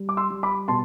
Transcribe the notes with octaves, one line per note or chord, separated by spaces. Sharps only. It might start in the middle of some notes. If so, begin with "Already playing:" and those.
Already playing: G3
D6
C6 E6
G3
B5 D6
B2 A5 C6